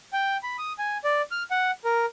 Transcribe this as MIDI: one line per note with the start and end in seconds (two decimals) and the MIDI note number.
0.13 0.37 79
0.43 0.57 83
0.59 0.73 87
0.79 0.98 80
1.04 1.22 74
1.31 1.43 89
1.51 1.71 78
1.85 2.06 70